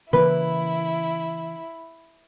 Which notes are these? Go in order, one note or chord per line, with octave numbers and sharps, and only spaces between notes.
C#3 E3 A#3 E4 B4